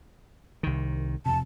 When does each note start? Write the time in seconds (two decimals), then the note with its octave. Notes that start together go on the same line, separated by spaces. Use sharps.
0.63 C2 D#3
1.26 E1 F2 C3 A5